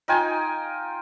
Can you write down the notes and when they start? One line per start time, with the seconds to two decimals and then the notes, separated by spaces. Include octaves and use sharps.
0.08 D#4 F4 G5 G#5